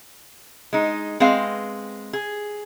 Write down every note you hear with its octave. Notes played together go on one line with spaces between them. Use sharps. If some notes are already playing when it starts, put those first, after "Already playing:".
G#3 D#4
G#3 C4 B4 F5 G#5
G#4